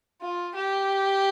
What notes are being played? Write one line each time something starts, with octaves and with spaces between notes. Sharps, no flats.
F4
G4